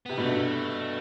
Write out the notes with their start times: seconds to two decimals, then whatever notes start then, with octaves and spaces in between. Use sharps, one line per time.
0.06 C3 B3
0.17 G2 B2 A3